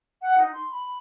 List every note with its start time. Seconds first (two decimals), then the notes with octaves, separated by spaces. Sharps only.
0.22 F#5
0.38 D#4
0.53 C6
0.70 B5